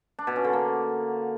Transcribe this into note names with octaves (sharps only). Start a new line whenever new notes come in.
D4
B2
C#4
D3
A#3